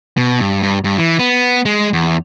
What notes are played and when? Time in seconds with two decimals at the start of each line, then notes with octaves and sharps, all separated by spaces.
0.17 B2
0.40 G2
0.63 G2
0.84 G2
0.98 E3
1.19 B3
1.65 G#3
1.93 E2